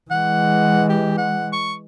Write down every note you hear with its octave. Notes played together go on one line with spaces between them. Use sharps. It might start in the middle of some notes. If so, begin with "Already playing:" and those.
E3 G#3 F#5
G4
F#5
C#6